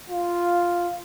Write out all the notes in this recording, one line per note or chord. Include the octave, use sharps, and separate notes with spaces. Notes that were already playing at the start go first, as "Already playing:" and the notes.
F4